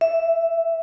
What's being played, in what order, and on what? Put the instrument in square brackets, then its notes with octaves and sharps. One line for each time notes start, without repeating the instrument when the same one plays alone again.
[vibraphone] E5